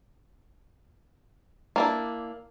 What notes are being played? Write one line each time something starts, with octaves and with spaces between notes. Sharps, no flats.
A#3 D4 E4